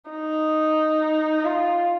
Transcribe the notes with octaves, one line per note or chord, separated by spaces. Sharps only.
D#4
F4